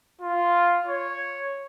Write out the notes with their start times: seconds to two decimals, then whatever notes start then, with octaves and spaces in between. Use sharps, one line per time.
0.22 F4
0.86 C#5